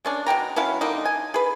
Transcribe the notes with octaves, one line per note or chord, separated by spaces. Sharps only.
G#3 C#4 D4
B2 G#3 G5 A#5
F#3 C#4 E4 F5
D3 A#3 D#4
G#5
G#4 B4